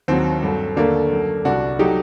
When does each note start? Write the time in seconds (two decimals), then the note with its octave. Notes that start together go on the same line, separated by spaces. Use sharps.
0.08 D#2 D#3 F#3 C4
0.42 G2 F#3 A3
0.76 D#2 D3 A3 A#3 D4
1.11 F#2 F#3 A3
1.45 C2 C3 G3 D4 F#4
1.79 F#3 A3 D#4 G4